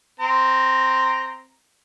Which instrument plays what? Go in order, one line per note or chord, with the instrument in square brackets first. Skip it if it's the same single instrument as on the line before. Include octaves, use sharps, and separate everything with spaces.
[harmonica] C4 A#5